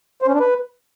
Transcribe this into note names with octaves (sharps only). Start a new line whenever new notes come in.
C5
C#4
D4
B4